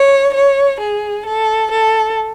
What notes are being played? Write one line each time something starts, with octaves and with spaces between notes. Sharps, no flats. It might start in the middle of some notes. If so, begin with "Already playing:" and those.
Already playing: C#5
C#5
G#4
A4
A4